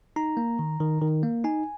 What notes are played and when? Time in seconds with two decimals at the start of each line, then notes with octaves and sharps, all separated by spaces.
0.16 D#4 A#5
0.37 A#3
0.59 D#3
0.80 D#3
1.02 D#3
1.23 A#3
1.44 D#4 G#5